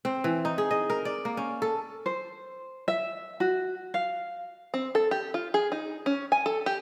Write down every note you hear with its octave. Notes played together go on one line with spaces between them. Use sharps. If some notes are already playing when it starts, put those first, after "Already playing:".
C4
E3
D#4
G#4
D#5
A#4
D5
A#3
C#4
A4
C5
E5
F#4
F5
C4
A4
G4
F4
G#4
D#4
C#4
G#5
A4
G4